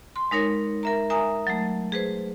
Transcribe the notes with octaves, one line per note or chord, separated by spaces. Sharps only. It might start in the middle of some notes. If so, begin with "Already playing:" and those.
C6
G#3 D#4 A#4 C#5
A#4 E5 A#5
A#4 E5 G#5 A#5 D#6
F#3 A3
G#4 B4 C5